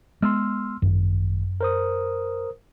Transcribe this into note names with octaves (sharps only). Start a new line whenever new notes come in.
G#3 B3 C6 E6 F6
G#1 F#2
A#4 C5 D#6